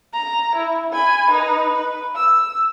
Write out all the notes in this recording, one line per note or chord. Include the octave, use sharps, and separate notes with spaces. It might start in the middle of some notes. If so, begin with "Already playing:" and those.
A#5
E4
G#5 B5
D#4 B4
B4
E6